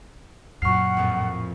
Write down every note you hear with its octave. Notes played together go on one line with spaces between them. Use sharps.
F#2 A#2 F#5 C#6 F6 C7
A#1 F2 A2